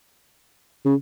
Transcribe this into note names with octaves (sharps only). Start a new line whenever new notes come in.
C#3